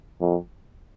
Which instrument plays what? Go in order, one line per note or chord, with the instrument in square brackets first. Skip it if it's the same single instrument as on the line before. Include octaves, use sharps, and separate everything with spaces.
[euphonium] F2